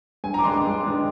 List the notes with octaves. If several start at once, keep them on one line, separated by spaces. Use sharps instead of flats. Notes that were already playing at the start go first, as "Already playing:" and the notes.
G2 G#5
A#5
D6
D#3 G#3 D4 C6
D6
G2
D#3 G#3 D4